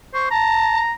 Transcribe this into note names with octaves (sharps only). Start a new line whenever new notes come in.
C5 C#6
A5 A#5